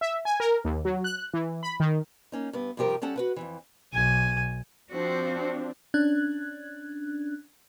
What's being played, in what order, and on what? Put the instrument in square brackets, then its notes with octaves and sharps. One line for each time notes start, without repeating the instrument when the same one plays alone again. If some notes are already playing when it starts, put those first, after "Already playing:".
[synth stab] E5
G#5
A#4
D#2
F#3
F#6
E3
B5
D#3
[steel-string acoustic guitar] A#3 C#4 D#4
G2 B3
G2 C3 F3 G4 A#4
G3 C#4 A4 F#5 A5
F#4 B4 F#5
F2 G#2 E3
[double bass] B1 [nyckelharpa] G#5
[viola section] F3 C4 D4 [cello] F#4 C5
[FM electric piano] C#4 D4 F#6 G#6